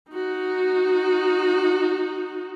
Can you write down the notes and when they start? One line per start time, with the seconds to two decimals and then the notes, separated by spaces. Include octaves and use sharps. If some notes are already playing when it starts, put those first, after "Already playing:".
0.11 D#4 F#4